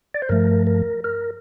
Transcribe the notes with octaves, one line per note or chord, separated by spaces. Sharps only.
D5
C5
G2 F3 A3 A#4
A#4
A#4